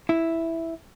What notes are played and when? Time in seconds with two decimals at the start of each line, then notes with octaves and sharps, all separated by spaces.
0.09 E4